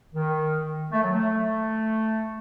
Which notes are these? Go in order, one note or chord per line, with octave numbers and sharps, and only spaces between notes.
D#3
A3
F#3
A3